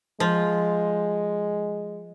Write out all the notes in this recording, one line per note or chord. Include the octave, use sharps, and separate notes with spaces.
F3 G#3